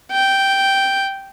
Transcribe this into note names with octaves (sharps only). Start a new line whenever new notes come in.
G5